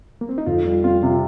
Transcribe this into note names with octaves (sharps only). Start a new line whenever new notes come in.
A#3
C4
D#4
F2 F4
G3
C4 F4
C3